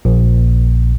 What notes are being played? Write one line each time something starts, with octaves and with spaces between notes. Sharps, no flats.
A#1